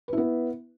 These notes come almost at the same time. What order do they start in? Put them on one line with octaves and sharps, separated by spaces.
B4 E4 B3